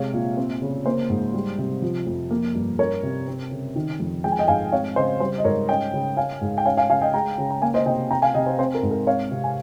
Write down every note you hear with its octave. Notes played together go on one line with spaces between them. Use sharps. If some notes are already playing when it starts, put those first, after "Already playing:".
Already playing: C3 G#3 C#5 F5
A#2
C4
C#3
A#3 C5
G#2
G3
C3
F3
F2
A#3
G2
C#4 A#4 C#5
C3
C4
C#3
D#3
F2
G#3 G5
G#5
D#5 G5
G#2 F5 G#5
C4 C#5 F5
C#3 C5 D#5
G3 C5
D#5
G#2 A#4 C#5
C#4 D#5 G5
C#3
C#4 F5 G#5
G#2
G5
C#4 F5 G#5
F5 G#5
C#3 F5 G#5
D#5 G5
G#3 G5 A#5
C#3
A#5
A#3 F5 G#5
C5 D#5
C3 D#5 G5
C4 G5 A#5
F5 G#5
C3 D#5 G5
C5
C4 C5
A#4
G#2
A#4
C4 C#5 F5
C3
G#5